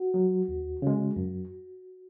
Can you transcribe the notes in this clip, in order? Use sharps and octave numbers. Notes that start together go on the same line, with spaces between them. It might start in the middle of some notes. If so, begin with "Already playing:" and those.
Already playing: F#4
F#3
D#2
C#3 G#3
F#2